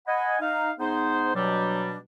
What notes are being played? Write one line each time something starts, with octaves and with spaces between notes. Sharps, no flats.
D#5 F#5 G#5 B5
D#4 F5
G#2 B3 D#4 G#4 C5
B2 F#3 G3 D4